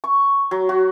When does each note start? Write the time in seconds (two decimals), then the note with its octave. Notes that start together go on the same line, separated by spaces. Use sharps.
0.04 C#6
0.51 F#3
0.69 F#4